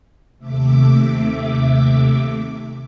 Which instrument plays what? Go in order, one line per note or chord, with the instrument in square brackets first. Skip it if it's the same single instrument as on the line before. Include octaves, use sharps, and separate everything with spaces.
[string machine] D#2 C3 A3 E5 D6